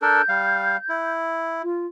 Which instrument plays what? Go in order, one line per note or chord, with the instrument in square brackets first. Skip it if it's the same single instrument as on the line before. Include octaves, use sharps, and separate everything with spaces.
[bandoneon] D4 A4 A#4 [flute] G6
[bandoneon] G3 F5
E4
[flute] F4